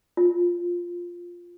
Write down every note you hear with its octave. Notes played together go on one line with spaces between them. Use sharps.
F4